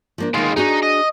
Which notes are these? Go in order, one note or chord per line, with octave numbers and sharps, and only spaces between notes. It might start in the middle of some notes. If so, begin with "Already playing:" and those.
F3 A#3 D4
D#3 G#3 A#3 F4
D4 D#4 F#4 G#4
D#5